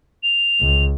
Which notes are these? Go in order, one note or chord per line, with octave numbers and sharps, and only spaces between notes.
F7
C#2